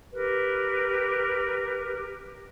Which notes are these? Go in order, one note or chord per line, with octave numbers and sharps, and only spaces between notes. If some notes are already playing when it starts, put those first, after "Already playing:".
G4 A#4 B4